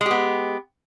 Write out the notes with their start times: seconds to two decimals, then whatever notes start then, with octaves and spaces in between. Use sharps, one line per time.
0.01 G#3
0.06 G4
0.11 B3